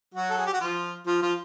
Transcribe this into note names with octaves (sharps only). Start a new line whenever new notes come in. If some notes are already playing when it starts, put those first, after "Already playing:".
F#3 F#4
A4
G#4
G4
F#4
F3 F4
F3 F4
F3 F4